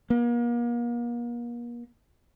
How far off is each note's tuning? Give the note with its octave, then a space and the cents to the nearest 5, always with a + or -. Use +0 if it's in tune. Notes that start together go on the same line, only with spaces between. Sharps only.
A#3 +40